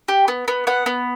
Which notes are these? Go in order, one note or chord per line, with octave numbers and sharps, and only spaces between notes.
G4
B3
B3
B3 F#5
B3